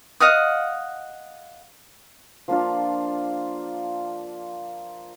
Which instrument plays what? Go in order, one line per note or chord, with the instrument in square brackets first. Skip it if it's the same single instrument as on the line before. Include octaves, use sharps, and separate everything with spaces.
[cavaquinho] D#5 F5 F#5 D#6
[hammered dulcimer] F3 A#3 D4 F4